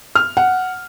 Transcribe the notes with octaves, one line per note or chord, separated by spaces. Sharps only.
F6
F#5